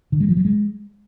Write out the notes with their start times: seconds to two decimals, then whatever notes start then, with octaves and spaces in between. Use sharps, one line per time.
0.12 D3
0.20 G#3
0.29 F3
0.37 F#3
0.45 G#3